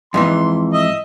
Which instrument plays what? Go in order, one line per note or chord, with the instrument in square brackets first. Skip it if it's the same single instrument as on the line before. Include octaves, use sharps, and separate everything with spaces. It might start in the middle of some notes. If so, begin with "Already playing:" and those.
[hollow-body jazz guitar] F2 G#2 E3 [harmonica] C6
[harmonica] D#5 E5